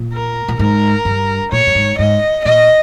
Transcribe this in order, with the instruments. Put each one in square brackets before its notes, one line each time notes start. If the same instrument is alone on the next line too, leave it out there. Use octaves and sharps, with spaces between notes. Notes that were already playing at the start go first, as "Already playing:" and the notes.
Already playing: [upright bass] A#2
[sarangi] A#4
[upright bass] A#2
[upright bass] G#2 [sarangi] A#4
[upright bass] G2
[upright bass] A#2 [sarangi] C#5
[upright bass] G2
G#2
[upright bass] G#2 [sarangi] D#5
[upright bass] A#2 [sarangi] D#5